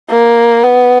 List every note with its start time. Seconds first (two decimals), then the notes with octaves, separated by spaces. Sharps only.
0.09 A#3
0.63 B3